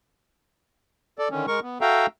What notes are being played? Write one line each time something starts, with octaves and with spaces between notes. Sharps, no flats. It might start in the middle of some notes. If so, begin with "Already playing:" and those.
A4 D5
D3 D#3 C#4
G#3 A#4 C#6
B3
F#4 A4 E5 F5 G5 A#5